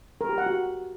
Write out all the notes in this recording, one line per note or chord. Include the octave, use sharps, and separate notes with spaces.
A#4
G4
F#5
F#4